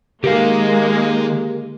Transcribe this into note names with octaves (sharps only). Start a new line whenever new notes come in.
D#3 G#3 A#3 G4 A#4 F5